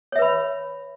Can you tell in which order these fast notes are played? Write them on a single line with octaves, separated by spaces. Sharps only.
C#5 E5 B4 B5